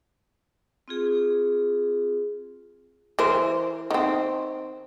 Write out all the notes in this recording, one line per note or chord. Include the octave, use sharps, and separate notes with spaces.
C4 F4 G#4
E3 A#4 C5
D#3 C4